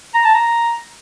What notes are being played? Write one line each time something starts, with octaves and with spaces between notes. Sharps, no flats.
A#5
A5
A#5